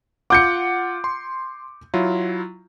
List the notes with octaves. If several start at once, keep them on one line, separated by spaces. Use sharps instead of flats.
F4 F#5 D6 G6 C#7
C6
F#3 E4 F4